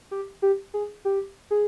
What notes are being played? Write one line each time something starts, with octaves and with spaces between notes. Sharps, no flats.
G4
G4
G#4
G4
G#4